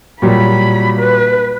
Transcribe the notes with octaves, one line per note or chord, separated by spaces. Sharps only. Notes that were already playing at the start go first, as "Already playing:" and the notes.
A#2 F#3 G3 B5
B4